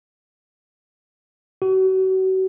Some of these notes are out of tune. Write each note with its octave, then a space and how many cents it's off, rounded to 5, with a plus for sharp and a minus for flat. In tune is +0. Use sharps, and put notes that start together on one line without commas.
F#4 +35